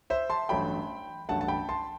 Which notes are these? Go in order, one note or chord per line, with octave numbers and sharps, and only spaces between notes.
C5 E5
A5 C6
A1 G2 F#3 A3 G5 B5
A1 G2 F#3 A3 F#5 A5
A5
G5 B5
A5 C6